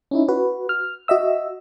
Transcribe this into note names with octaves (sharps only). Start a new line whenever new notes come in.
C#4 D#4 E4
F#4 B4
F6
F#4 D#5 E5 E6